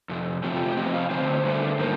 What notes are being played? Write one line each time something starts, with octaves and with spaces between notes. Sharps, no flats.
F2 C3
C3 F3 A3 C4 G4
F4
G4
C3 F3 C4 D#5
F5
D3 A3 C4 C5
G2 D3 A3
D#3 G3 A#3